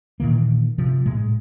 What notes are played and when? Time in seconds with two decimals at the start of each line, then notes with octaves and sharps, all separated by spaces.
0.20 A#2 D#3 E3 A#3
0.78 C3 F3
1.06 A2 G#3